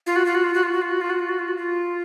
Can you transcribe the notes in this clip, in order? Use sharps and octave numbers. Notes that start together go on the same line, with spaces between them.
F4
F#4
F4
F#4
F4
F#4
F4
F#4
F4
F#4
F4
F#4
F4
F#4
F4
F#4
F4